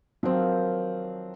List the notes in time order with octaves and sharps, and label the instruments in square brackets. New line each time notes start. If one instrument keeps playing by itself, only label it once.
[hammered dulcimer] D#3 F3 [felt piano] F#3 C4